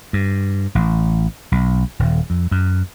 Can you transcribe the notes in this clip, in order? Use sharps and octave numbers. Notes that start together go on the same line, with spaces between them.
G2
A1
B1
D#1
F2
F#2